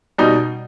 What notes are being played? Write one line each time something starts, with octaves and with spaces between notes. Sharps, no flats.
B2 G3 D#4 F#4